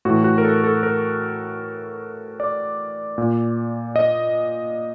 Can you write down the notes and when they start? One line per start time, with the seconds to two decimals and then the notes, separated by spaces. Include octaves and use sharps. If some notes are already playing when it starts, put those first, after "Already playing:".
0.05 A2 E3 F#4
0.24 F#4
0.38 A#4
0.45 A4
0.64 A4
0.83 A#4
2.40 D5
3.18 A#2
3.96 D#5